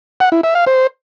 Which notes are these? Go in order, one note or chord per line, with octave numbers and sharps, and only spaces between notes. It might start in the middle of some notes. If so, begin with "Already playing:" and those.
F#5
E4
E5
F5
C5